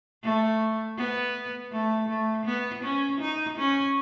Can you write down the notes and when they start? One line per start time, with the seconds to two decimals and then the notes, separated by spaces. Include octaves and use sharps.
0.23 A3
0.97 B3
1.72 A3
2.09 A3
2.46 B3
2.84 C#4
3.21 D#4
3.57 C#4